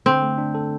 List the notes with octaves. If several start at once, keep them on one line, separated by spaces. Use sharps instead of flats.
D3 C4
A3
D4
A4